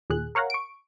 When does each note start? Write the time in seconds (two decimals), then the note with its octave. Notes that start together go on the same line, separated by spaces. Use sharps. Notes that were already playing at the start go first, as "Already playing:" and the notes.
0.10 D#2 A#2 G#4 F#6
0.35 A#4 C#5 F5 F#5 A#5
0.50 C#6 D7